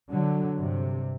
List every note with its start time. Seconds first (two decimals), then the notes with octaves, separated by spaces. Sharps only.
0.10 D3 F#3
0.57 G2 C3